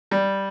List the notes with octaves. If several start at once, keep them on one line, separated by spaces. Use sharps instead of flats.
G3